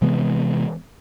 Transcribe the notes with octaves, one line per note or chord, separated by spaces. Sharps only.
C3 E3 G#3 B3